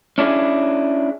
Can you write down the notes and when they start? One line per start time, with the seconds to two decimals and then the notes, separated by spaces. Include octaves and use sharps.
0.18 C#4 D4 E4 G#4